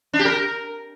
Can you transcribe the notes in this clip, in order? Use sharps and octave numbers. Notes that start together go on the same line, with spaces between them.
D4
G4
A#4